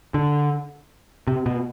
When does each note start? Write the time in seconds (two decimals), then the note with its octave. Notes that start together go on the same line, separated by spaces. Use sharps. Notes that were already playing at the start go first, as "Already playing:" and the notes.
0.14 D3
1.27 C3
1.46 B2